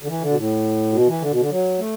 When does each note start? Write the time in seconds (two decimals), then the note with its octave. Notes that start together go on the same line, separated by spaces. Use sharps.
0.03 D3
0.08 E3
0.21 D3
0.31 B2
0.37 A2
0.93 B2
1.08 E3
1.22 D3
1.31 B2
1.40 D3
1.50 F#3
1.79 A3